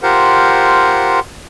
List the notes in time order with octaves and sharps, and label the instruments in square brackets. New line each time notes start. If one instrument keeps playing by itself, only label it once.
[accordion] F4 G4 A#4 C5 F#5